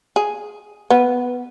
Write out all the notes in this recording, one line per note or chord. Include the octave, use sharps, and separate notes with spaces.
G#4
B3 B4